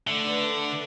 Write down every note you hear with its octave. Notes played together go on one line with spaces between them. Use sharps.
D3 A3
D4 B4 D5
A3
D4 B4 D5